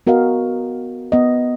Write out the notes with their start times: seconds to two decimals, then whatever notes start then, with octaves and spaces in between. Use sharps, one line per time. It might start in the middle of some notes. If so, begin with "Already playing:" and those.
0.07 B3 F#4 A#4 D#5 F5
1.12 B3 D#5